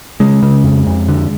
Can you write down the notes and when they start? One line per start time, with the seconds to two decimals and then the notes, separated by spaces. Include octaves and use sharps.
0.20 C#3 G#3
0.43 C#3
0.64 F2
0.87 F2
1.09 D3